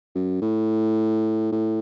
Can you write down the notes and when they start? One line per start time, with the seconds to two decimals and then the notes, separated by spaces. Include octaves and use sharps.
0.15 F#2
0.42 A2
1.52 A2